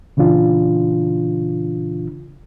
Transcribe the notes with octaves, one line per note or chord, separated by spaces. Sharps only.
A#2 C#3 E3 D4 F4